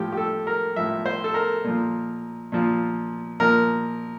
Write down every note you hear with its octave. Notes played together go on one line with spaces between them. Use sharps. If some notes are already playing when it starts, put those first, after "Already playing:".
Already playing: A2 F3 G4
G4
A4
A#4
A2 F3 E5
C5
A4
A#4
A#2 F3
A#2 F3
A#2 F3 A#4